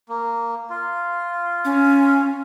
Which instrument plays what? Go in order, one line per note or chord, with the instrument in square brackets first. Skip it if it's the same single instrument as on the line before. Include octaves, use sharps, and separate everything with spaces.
[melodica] A#3
F4
[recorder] C#4